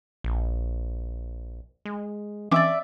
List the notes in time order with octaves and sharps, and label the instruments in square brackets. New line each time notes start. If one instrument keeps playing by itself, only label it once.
[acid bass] A#1
G#3
[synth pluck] E3 C4 C#4 [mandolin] D5 E5 D6